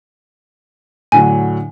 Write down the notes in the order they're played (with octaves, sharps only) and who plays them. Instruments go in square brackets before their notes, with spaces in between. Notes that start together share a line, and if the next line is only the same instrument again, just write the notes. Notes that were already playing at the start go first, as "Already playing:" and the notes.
[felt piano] A2 D3 F#3 [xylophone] G#5